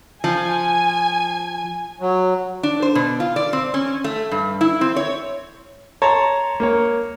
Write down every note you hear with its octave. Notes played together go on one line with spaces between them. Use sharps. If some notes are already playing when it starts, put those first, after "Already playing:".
F3 G#5
F#3
D4
C5
B2
F4
D5
C4
C#4
A3
G2
E4
C4
C#5
C#5 A5 A#5 C6
A#3 C#5